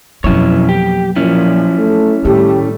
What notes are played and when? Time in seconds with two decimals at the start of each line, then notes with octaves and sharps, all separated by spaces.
0.24 F2 B2 F#3 A#3 C#4 E4 C#5
0.69 G4
1.16 A#2 F3 C#4 E4
1.78 A3
2.25 A2 D#3 G3 A3 G4